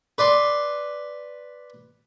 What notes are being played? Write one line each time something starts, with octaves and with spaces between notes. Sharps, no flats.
B4 D5 C6